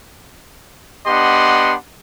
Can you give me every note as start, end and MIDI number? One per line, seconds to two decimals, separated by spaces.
1.07 1.74 59
1.07 1.74 62
1.07 1.74 67
1.07 1.74 75
1.07 1.74 78
1.07 1.74 84